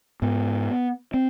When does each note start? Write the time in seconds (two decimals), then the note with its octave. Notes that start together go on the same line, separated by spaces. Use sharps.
0.22 G#2 B3
1.14 C4